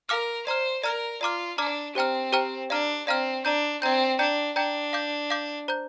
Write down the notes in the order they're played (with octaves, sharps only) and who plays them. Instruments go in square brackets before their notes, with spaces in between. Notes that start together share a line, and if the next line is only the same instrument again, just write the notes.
[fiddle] A#4 [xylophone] F5 D6 F6
[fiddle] C5 [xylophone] D5 A#5 F6
[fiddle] A#4 [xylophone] D5 A#5 F6
[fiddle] F4 [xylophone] D5 A#5 D6 F6
[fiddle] D4 [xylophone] D5 A#5 D6 F6
[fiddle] C4 [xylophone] G4 C5 G5 A#5 F6
[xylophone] G4 C5 G5 A#5 F6
[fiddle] D4 [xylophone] D5 F5 A#5 F6
[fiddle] C4 [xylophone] D5 F5 A#5 F6
[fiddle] D4 [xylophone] D5 A#5 G6
[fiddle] C4 [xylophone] D5 A#5 G6
[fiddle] D4 [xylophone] D5 G5 A#5 G6
[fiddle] D4 [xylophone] D5 G5 A#5 G6
[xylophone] F5 D6 G6
F5 D6 G6
C5 A#5 G6